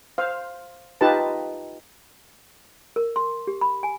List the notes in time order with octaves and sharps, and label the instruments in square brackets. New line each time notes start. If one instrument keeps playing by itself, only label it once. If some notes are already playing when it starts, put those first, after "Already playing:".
[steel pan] C5 F5
D#4 F4 G4 B4 A5
[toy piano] A#4
C6
G4
B5
G#5